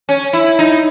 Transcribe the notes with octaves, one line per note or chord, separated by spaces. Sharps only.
C#4
E4
D#4